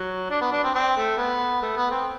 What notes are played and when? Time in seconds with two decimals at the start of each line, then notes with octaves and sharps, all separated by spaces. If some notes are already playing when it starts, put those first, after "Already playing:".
Already playing: F#3
0.30 D4
0.41 B3
0.52 D4
0.64 C4
0.75 C4
0.97 A3
1.17 B3
1.62 A3
1.77 B3
1.91 C4